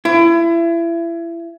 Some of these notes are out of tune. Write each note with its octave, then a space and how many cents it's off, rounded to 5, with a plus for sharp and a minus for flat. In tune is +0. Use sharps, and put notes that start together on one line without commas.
E4 +30